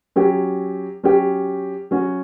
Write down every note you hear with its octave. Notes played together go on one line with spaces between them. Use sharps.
F#3 C#4 G4
F#3 C#4 G4
F#3 C#4 F#4